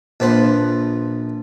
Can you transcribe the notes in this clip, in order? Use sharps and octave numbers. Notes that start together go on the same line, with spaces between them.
A#1 F3 B4 C5